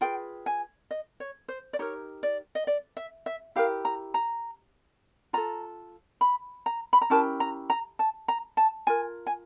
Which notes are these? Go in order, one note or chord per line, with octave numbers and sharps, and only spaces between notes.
F4 G#4 B4 G5
G#5
D#5
C#5
C5
D5
D#4 G4 A#4 C#5
D5
D#5
D5
E5
E5
E4 G4 A#4 F5
A#5
A#5
F4 A4 A#5
B5
A#5
B5
A#5
C#4 E4 G4 A#4 A5
A#5
A#5
A5
A#5
A5
F4 A#4 G#5
G#5